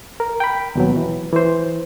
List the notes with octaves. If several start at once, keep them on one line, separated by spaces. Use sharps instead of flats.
A#4
G5 B5
D#2 B2 F#3
E3
E3 C5